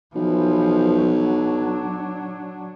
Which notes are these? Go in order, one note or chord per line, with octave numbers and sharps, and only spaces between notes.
B1 E3 F3
F#3 D4